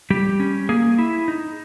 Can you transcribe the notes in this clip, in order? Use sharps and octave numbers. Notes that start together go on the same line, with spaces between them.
G3 G4
C#4
A#3 G#4
E4
D#4